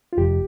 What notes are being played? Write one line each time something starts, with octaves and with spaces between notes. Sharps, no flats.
F4
F1 F2 C3 G4